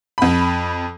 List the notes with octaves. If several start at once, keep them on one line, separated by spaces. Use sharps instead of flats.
F2 B5